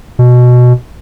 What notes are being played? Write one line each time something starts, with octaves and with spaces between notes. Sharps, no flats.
B2